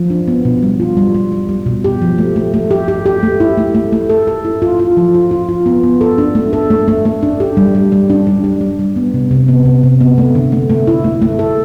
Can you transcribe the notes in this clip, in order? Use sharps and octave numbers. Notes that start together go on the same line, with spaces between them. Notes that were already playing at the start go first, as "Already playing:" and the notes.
Already playing: F3
D4
B3
B2
G3
F4
G3
G3
G3
G3
B2
G4
F3
A3
A3
A3
G4
G4
G4
A3
E4
A3
A3
A3
A4
A4
E4
F4
F4
F3
F4
F4
F4
B3
B3
A4
D4
A3
A4
A3
A3
A3
D4
G4
G3
G3
G3
D4
G3
G3
G3
G3
B3
C3
C3
B3
C3
C3
B3
A3
D3
A3
A3
E4
A3
A3
A4